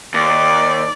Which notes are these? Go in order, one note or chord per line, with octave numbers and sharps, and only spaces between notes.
D#2 D5